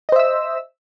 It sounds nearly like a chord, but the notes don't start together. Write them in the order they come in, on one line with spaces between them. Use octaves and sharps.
D#5 C5 E5 E6